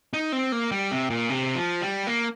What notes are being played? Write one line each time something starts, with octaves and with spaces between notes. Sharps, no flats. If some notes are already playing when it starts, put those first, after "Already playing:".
D#4
C4
A#3
G3
C3
A#2
C3
F3
G3
A#3